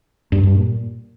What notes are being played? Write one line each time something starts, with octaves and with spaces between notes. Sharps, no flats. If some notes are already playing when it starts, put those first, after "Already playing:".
G2
G2
A#2